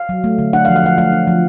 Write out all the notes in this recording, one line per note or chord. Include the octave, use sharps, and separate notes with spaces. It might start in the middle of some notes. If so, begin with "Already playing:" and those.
Already playing: F5
F#3
A3
D3
D4 F#5
F5
F3
F5
F3 F#5
A3 F5
D4
F3